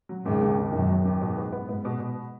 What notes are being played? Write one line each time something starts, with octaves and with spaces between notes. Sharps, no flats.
F#3
D#2 G#2 C#3
D#2
D#2
F#2 B2 D#3
F#3
D#2
G#2 B2
B3
B3
G#2 B3
B2
B2